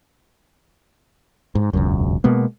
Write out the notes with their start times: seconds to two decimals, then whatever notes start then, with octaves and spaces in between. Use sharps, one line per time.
1.55 G#2
1.73 E1 C#2 F#2
2.24 B2 G#3 A#3 B3